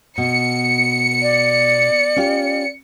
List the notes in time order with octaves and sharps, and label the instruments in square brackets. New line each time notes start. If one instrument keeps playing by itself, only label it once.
[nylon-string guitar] B2 [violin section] C#7
[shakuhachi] D5
[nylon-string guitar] C#4 F4 G4